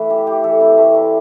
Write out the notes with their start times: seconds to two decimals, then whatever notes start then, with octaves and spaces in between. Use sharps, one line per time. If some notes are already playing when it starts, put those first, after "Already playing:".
Already playing: E3 A3 A4 B4
0.10 E4 G4
0.27 E3 G4
0.44 E3 A4
0.61 C3 B4
0.78 A3
0.95 C3 D5